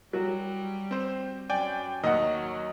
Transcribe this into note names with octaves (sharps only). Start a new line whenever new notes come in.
F#3 G3 F#4
C4 C5
F#2 D5 G5 G#5
D#2 F#3 D#5 F#5